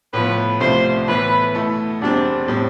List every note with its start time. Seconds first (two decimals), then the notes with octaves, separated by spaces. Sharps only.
0.13 A2 F3 B3 B4
0.60 C2 C3 F3 A3 C5
1.07 A2 E3 B3 E4 B4
1.55 B2 A3 E4 A4
2.01 E2 B2 G3 C4 D4
2.48 A2 G3 C4